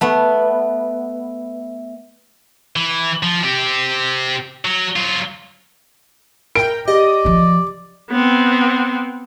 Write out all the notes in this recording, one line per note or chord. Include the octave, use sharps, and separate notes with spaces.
A3 B3
E3
F3
C4 G4
F#3
F#3 F4
A#4 G5 D7
G4 D5 D#5
C#3 F3
B3 C4